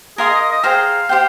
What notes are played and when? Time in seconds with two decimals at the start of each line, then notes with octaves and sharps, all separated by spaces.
0.18 G#4 A#4 F5 C6 D#6
0.30 D#5
0.41 D#5
0.53 D#5
0.64 G#4 C5 F5 G5 A#5
1.09 G4 C5 G5